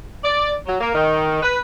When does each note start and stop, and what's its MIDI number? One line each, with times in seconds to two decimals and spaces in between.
0.23 0.55 74
0.66 0.78 54
0.80 0.93 58
0.94 1.38 51
1.42 1.60 71